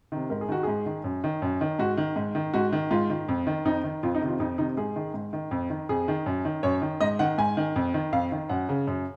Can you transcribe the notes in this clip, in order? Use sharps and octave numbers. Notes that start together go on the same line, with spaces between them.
C3 D#3
G#2 A#4
G#4
D#3 F#4
G#2 G#4
D#3
F#2
D#3
F#2
D#3
G#2 F#4
D#3
G#2
D#3
G#2 F#4
D#3
G#2 F4
D#3
F2
D#3
F2 D#4
D#3
F2 F4
D#4
C3 D#3
F4
F2 D#4
C3 D#3 D#4
G#2 G#4
D#3
G#2
D#3
F2
D#3
F2 G#4
D#3
F#2
D#3
F#2 C#5
D#3
G#2 D#5
D#3 F#5
G#2 G#5
D#3
F2
D#3
F2 F5
D#3
F#2 F#5
C#3
F#2